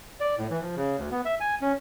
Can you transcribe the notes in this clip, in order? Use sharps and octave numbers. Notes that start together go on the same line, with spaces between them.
D5
A2
E3
F3
C#3
D2
B3
E5
G#5
C#4